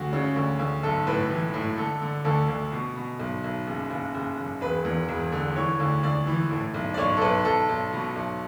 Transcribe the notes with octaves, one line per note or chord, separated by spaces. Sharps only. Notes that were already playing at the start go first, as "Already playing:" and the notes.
Already playing: D2 F#4
C#3
D2
D2
B1 A4
A2 B4
E3
A2
D3 A4
D3
D2 A4
D2
B2
B2
B1
B1
F#1
F#1
F#1
F#1
E1 B4
E2
E1
D3
E3 C#5
D2
D2 D5
E3
A2
B1
D5
B1 C#5
A4
B1 B4
B1 A4
B1
B2
B1